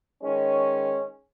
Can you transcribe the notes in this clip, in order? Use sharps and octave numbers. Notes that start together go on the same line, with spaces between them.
D#3 G#3 C#4